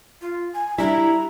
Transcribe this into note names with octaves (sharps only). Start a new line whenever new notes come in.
F4
G#5
G3 D4 E4 A#5